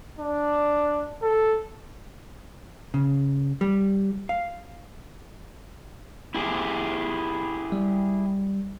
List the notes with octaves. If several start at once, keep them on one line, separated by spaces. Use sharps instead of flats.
D4
A4
C#3
G3
F5
E4 G4 G#4
G3